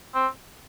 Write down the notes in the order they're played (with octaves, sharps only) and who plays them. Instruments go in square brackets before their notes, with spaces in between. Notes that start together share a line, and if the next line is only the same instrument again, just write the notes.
[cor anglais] C4